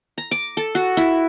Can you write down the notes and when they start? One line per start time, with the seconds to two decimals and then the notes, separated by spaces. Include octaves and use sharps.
0.18 A#5
0.31 D6
0.57 A4
0.75 F#4
0.97 E4